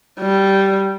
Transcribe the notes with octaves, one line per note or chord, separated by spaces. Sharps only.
G3